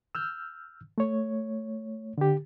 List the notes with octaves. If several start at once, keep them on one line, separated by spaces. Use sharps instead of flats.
E6 F6 G6
A3 C#5
D3 G4